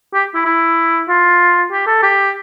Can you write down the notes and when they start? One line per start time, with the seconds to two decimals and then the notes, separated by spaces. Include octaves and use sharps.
0.14 G4
0.35 E4
0.45 E4
1.08 F4
1.72 G4
1.87 A4
2.02 G4